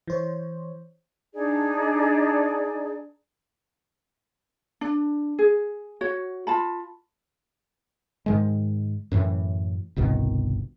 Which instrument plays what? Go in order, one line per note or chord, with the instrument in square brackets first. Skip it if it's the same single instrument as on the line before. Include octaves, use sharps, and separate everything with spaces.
[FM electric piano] E3 C5 C#5
[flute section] D4 D#4 G#4 D5
[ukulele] D4
G#4
F#4 C#5
F4 A5 B5
[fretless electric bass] G#2 D#3 G#3
F#2 A2 E3
G1 C2 B2 D#3